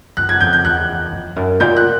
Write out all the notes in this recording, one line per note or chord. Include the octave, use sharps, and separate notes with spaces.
F#2 F#6
G#6
F2 G6
G6
E2 F#6
F2
F#2
A#2 G6
F#6